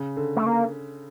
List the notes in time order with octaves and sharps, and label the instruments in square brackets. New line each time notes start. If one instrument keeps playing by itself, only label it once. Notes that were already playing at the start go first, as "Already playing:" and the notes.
Already playing: [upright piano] C#3
D3
[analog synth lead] A3
A#3